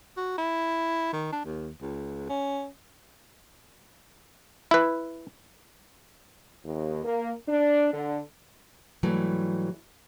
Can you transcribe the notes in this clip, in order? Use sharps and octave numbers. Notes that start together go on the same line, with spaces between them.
F#4
E4
D#3
D4
D#2
C#2
C#4
E4 B4
D#2
A#3
D4
D3
G#2 E3 F#3 G3 A3